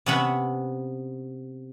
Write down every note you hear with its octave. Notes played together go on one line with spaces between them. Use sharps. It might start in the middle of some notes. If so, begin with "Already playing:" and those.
C3 B3 C#4 F#5 B5